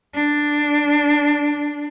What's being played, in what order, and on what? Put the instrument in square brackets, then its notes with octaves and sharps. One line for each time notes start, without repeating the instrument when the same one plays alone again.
[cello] D4